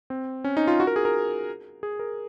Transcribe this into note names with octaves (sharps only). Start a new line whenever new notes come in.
C4
C#4
D#4
F4
F#4
A#4
G#4
A#4
G#4
A#4